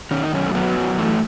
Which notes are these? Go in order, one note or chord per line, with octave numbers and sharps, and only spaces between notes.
D#3 C#4
D#4
F#2 C#4
A3
F#3 B3
F#2
E3 A3